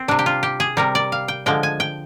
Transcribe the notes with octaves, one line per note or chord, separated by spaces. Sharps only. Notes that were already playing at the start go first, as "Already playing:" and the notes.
Already playing: C4
C3 G3 D4
G4
F4
G4
G#4
C3 G3 A#4
D5
F5
G5
D3 F3 G#3 G5
G#5
G5